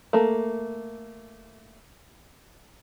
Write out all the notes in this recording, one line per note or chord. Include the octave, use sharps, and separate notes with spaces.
A3 A#3